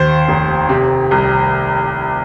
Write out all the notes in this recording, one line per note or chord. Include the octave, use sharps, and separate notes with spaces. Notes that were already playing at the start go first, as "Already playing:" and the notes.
Already playing: D#2 C5
F1
C3
C2